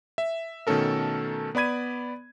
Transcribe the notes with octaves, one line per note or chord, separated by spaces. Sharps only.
E5
B2 D#3 A3 C#4 A4 A#4
B3 D5 B5 G#6 D#7